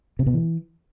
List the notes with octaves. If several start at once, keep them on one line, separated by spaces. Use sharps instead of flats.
C3
B2
E3